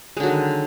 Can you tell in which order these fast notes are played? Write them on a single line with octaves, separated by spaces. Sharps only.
G#3 D3 F#3 D#3